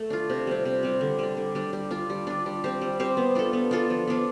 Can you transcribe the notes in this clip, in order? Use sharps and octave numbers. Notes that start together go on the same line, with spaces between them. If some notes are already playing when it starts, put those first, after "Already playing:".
Already playing: A3
D4 F4
C3
G3 C4
C3
G3 C4
D3
G3 D4
D3
G3 D4
G3
D4 F4
G3
D4 F4
G3
C4 G4 C5
G3
C4 G4 C5
B3
D4 F4 A4
B3
D4 F4 A4
F3
B3 D4 F4